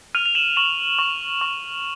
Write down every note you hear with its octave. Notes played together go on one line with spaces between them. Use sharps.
F6 D#7 F7
F7
E7 F#7
C#6 E7 F#7
C#6
C#6